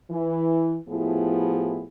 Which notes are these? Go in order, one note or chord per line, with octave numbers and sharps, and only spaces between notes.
E3
A2 F3 B3 E4 G4 G#4